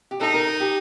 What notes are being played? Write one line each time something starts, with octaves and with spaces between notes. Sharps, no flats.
G4
D#4 A4
A#4
A#4
G4